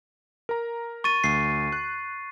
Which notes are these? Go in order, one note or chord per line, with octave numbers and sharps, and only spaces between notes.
A#4 A#5
C#6 A6 D#7
D2 C7
F#6